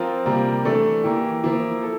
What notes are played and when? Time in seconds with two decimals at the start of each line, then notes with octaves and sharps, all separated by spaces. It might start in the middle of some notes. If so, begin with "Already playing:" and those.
Already playing: F3 C4 F4 A#4
0.26 C3 G3 A#3
0.65 E3 A3 D4 A4
1.04 E3 A#3 E4 G4
1.44 F3 A#3 E4
1.83 A4